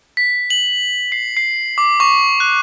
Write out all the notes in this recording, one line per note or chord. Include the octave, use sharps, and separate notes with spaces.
B6
F#7
C7
C7
D6
C#6
F#6